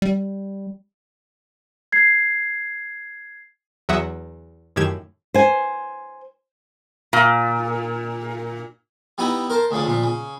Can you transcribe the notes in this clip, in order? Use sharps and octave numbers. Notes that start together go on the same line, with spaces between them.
G3
G#6 C7
E2 F#3 E5 F#5 D#6 A#6
F#2 A2 D#3 G4 G#6 E7
C5 G#5
A#2
G3 B3 D#4 E4 G4
A#4 C5 A5
D2 C#3 F3 D4
A#2 F3
C#3